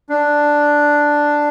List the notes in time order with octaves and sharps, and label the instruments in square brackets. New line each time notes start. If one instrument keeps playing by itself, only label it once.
[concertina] D4